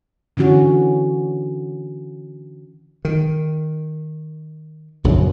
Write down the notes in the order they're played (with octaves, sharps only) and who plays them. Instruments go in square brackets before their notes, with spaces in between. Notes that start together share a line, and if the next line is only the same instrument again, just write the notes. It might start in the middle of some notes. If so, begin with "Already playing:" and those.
[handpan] D3 E3 C#4 F#4
[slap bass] D#3
A#1 F#2 C#3 F#3